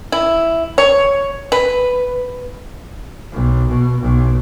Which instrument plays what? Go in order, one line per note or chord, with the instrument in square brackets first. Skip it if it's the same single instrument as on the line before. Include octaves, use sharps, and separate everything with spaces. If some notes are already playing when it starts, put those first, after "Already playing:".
[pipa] E4
C#5
B4
[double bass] B1
B2
B1